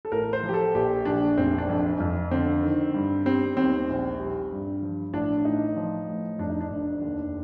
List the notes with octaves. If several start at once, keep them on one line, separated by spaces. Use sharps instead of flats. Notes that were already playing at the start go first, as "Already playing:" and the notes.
A4
A1 A#4
C5
F3
G4
A4
A#1 G4
A#1 D4
F1 C4
D4
F2
F2
D3 C4
D#3
G2
G3 C4
D#2 C4
A#1
G3
G2
F3
A1 D4
D4
A2 D#4
F3
A2
F2 D4
D#4
D4
F1
D#2